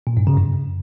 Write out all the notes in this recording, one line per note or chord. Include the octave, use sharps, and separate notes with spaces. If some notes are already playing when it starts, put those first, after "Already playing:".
A#2
G2
C#3
F#2